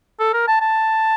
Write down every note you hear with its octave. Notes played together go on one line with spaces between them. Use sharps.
A4
A#4
A5
A5